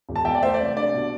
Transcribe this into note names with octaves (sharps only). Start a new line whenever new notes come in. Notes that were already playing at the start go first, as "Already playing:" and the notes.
E1
A5
E2 E5 G5
D5
A3 C5 E5
D5
C2
D5
D4 D5
B2